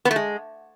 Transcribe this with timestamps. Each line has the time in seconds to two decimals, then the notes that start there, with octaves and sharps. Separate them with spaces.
0.05 B3
0.11 A3
0.16 G#3